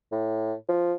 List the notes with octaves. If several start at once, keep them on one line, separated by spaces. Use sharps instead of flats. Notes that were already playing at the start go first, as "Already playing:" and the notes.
A2
F3